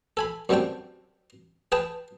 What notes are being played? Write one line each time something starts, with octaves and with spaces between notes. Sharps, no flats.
A4 G#5 B5
F#2 F#3 G3 C4 D4 G5
G#4 B4 G5 A5